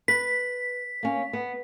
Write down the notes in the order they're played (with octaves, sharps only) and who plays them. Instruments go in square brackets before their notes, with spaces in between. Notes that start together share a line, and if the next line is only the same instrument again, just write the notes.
[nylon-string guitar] B4 [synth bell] B6
[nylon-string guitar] A#3 C#4
B3